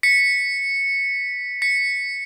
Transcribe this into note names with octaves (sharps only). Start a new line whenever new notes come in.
B6 C#7
B6 C#7